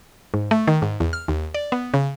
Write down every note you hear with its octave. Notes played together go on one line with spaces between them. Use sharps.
G#2
A3
D#3
G#2
E2
F6
D#2
D5
B3
C#3